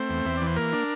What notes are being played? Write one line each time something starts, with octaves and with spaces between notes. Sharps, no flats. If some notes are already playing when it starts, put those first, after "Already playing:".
Already playing: A3 C4 C5
E2
E2 E5
E3 D5
C5
A#3 A#4
D4